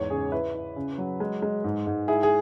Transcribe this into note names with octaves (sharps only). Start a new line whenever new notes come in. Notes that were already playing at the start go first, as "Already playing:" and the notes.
Already playing: E2 G#2 C#5
C#3 G#4
E4 B4
E4
C#3
F#3
G#3
G#3
G#2
G#2
E4 G#4
G#4